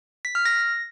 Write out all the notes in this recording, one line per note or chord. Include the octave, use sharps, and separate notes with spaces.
B6
F6
A#6